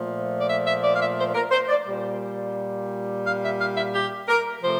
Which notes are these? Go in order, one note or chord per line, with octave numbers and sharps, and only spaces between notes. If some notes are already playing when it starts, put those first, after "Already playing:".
Already playing: A#2 F3 A3
D5
E5
E5
D5
F5
E5
C5
A#4
C5
D5
A#2 G3
F5
E5
F5
E5
G4
A#4
C3 F3 A3 C5